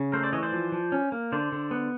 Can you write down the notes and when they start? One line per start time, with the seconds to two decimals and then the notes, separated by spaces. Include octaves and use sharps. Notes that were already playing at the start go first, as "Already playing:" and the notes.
Already playing: C#3
0.12 A3 A#4 C5
0.23 C5 D5
0.33 E3 C#5 D#5
0.43 C5 D5
0.52 F3
0.72 F3
0.92 C#4
1.12 A#3
1.32 D3 C5 D5
1.52 D3
1.71 B3